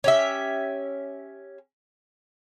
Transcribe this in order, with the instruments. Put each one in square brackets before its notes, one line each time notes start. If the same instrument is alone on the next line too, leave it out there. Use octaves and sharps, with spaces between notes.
[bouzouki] C#4 G4 E5